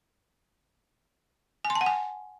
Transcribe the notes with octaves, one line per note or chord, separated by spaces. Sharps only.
G#5
C6
A5
F#5
G#5